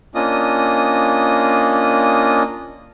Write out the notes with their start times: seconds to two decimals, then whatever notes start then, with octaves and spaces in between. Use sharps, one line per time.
0.15 A#3 C#4 D4 F4 D#5 D#6